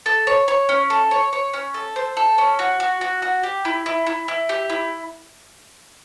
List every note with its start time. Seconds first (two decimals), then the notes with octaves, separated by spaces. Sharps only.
0.06 A4
0.27 C#5
0.48 C#5
0.69 C#4
0.90 A4
1.11 C#5
1.33 C#5
1.53 C#4
1.74 A4
1.96 C5
2.17 A4
2.38 C#4
2.59 F#4
2.80 F#4
3.01 F#4
3.22 F#4
3.43 G4
3.65 E4
3.86 E4
4.07 E4
4.28 E4
4.49 G4
4.70 E4